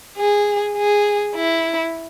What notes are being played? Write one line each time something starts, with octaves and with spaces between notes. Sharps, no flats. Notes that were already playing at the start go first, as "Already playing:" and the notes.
G#4
G#4
E4